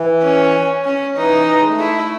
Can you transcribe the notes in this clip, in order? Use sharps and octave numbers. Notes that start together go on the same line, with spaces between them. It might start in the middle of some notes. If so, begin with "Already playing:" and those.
Already playing: E3
C#4
C#4
E3 D#4
E3
G#3
A3
E4